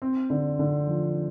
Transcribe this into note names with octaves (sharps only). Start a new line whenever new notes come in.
C4
D3
D3
F3